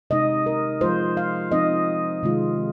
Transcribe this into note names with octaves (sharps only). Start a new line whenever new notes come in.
C3 G#3 D#4 D#5
A#4
F3 G#3 F4 C5
F5
F3 C4 D#4 D#5
C3 D#3 G#3 F4